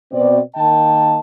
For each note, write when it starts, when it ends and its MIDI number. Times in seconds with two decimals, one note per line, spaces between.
0.12 0.39 47
0.12 0.39 60
0.12 0.39 74
0.55 1.20 51
0.55 1.20 58
0.55 1.20 75
0.55 1.20 79
0.55 1.20 81